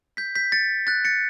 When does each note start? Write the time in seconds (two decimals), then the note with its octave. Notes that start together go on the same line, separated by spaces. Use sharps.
0.17 G6 B6
0.35 G6 B6
0.52 A6 C#7
0.87 F#6 A6
1.05 A6 C#7